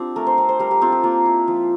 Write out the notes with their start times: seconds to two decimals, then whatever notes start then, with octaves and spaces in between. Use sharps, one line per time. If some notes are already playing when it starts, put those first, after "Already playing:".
Already playing: C4 D4 F4 G4
0.16 A3 A#4
0.27 C5
0.38 C4
0.49 C5
0.59 G3 A#4
0.71 G4
0.81 C4 F4
0.92 G4
1.03 A#3 F4
1.26 E4
1.48 F3